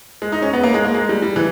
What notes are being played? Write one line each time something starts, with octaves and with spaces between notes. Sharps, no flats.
G#3
D#4
C#4
B3
A#3
G#3
A#3
G#3
G3
G3
E3